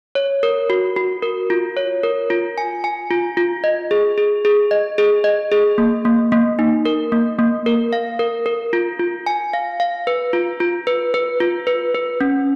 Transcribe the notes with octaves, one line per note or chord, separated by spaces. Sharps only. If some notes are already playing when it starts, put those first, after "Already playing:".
C#5
A#4
F#4
F#4
A#4
F4
C#5
A#4
F4
G#5
G#5
F4
F4
D#5
G#4
G#4
G#4
D#5
G#4
D#5
G#4
A#3
A#3
A#3
D#4
A#4
A#3
A#3
A#4
F5
A#4
A#4
F4
F4
G#5
F5
F5
B4
F4
F4
B4
B4
F4
B4
B4
C#4